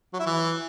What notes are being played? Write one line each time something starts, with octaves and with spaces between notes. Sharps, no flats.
F#3
E4
E3